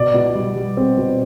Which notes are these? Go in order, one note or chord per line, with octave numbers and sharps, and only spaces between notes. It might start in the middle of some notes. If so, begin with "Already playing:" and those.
Already playing: B2 D5
B2
G3
G3
C4
B2